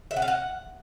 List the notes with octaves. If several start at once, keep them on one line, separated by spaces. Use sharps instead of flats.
E5
F#5
F5
F#5